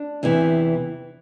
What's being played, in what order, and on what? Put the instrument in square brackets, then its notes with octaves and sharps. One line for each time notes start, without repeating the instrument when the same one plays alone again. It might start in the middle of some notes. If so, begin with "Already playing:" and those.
Already playing: [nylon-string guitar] D4
E2 C3 E3